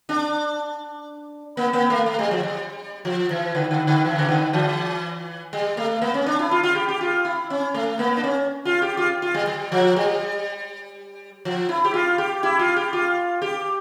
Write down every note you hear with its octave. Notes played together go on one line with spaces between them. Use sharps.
D4
A#3
A#3
A3
A3
G3
F3
G3
F3
E3
D3
D3
D3
E3
C#3
D3
E3
G3
A3
A#3
C#4
D4
E4
F4
F4
G4
G4
F4
E4
C#4
A3
A#3
D4
C#4
F4
G4
F4
F4
G3
G3
F3
G3
F3
E4
G4
F4
G4
E4
F4
G4
F4
G4